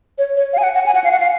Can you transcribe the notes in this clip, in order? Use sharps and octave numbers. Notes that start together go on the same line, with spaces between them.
C#5
C#5
F5
G#5
F#5
F#5
G#5
F#5
F5
F#5
F5